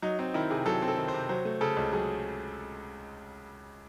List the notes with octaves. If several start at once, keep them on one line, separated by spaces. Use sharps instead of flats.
F#3 D#4
C4 D#4
D#3 E4
C3 G#4
F#3 A4
C4
A4
D#3
C5
C3
F#3 C5
A3
C#3 A4
C#2
F#3 G#4